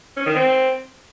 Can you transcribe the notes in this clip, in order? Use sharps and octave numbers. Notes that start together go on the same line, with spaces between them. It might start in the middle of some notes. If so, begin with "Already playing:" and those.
C#4
D#3
C4